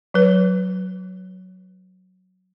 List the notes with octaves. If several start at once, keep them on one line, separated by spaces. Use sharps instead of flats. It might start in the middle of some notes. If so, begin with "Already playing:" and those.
F#3 B4